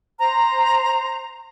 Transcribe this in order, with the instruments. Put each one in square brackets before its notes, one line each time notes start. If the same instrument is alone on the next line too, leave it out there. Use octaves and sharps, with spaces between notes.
[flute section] C5 A#5